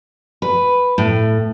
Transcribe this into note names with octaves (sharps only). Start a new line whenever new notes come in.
B4
A2